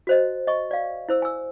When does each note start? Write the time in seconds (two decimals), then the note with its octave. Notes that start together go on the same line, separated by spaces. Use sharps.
0.07 F#4 C5 D#5
0.47 D#5 C#6
0.71 D5 F5
1.09 E4 C5 E6
1.22 G#5 E6